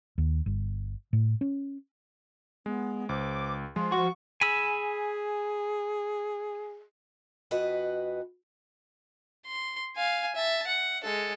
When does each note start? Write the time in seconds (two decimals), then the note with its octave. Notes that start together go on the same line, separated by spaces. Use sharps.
0.18 D#2
0.46 G1
1.13 A2
1.41 C#4
2.66 G#3 B3
3.09 C#2 C5 D6
3.76 F3 G#3 C6
3.92 F#4 C#6
4.41 G#4 G#5 B5 E6
7.51 F2 F#4 B4 D#5
9.47 C6
9.96 F5 G#5
10.35 E5 A5
10.67 F#5
11.04 G#3 A4